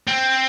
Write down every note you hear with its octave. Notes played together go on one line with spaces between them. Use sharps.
C4